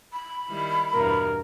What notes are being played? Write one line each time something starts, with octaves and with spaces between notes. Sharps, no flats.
B5
D#3 G3 E4
E2 G2 B2 A#4